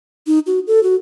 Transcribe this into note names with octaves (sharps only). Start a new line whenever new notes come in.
D#4
F#4
A4
F#4